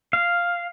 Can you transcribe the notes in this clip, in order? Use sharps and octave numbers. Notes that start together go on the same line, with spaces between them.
F5